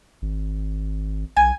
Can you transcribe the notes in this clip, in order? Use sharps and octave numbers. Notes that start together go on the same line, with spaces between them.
G#1
B1 G#5